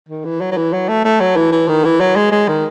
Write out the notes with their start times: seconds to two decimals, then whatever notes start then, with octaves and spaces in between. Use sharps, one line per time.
0.08 D#3
0.25 E3
0.41 F#3
0.51 F#3
0.57 E3
0.73 F#3
0.89 A3
1.04 A3
1.20 F#3
1.36 E3
1.52 E3
1.68 D#3
1.84 E3
2.00 F#3
2.16 G#3
2.32 G#3
2.48 D#3